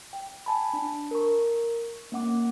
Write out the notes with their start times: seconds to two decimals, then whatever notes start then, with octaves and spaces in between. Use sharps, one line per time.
0.13 G5
0.46 G#5 A5 B5
0.73 D4
1.11 A#4 C#6
2.12 A#3 C#4 F#5 D6